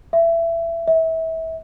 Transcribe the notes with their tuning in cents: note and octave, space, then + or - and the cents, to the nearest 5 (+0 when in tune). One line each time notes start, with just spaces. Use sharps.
E5 +20
E5 -25